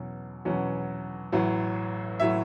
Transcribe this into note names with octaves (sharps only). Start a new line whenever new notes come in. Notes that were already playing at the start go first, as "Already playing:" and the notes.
Already playing: E2 B2 F#3 C#4
E2 B2 F#3 C#4
A1 A2 F#3
A2 F#3 E5